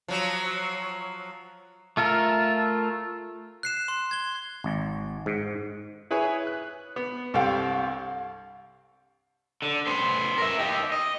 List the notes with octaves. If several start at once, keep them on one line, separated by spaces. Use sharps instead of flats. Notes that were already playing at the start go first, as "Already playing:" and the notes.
F3 F#3
A3 F4 A4 A#4
F#6 C7 E7
C6
G#6 G7
G#1
G#2
E4 G#4 B4 C#5 G#5
F#6
B3
C2 G2 C4 A4 F5 G5
D3
B3 C5
A#4 E5
D#4 G4
D#5